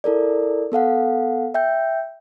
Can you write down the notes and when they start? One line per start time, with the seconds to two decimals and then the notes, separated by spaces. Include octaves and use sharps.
0.04 E4 A4 A#4 D5
0.72 B3 A4 F5 F#5
1.54 E5 G5 G6